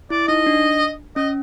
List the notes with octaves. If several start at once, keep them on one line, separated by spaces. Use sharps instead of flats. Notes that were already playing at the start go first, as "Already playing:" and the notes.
E4 D5
D#4 D#5
D4
C#4 D#5